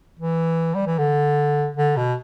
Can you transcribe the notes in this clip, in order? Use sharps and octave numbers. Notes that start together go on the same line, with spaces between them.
E3
G3
E3
D3
D3
B2